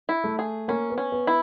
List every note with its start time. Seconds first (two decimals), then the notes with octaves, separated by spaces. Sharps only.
0.09 E4
0.24 A3
0.39 G#4
0.68 A#3 C#4
0.90 B3
0.98 C#4
1.12 B3
1.27 E4